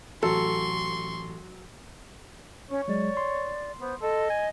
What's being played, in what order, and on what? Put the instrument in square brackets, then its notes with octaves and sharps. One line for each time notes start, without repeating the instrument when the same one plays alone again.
[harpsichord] A1 [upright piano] F#3 [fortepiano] A4 [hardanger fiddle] C6 C#6
[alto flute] C#4 [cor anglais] C#5
[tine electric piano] F#3 G#3 [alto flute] D5
[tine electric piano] C6
[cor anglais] B3 [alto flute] C5
[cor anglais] A4 [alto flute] D#5
[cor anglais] G#5